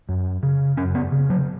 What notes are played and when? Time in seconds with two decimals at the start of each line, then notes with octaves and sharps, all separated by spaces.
0.09 F#2
0.43 C#3
0.77 F#2 C#4
0.95 B3
1.12 C#3
1.30 F#3